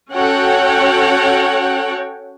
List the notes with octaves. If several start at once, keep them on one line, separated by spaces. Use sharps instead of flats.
C#4 F#4 A4 C#5 F#5 G5